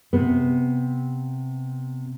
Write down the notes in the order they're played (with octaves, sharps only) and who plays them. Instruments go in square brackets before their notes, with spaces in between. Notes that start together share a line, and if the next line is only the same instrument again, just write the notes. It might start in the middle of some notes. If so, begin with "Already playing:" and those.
[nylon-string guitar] C3 B3